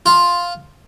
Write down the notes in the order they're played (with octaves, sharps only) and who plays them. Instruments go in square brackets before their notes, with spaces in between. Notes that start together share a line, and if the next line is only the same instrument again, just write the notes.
[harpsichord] F4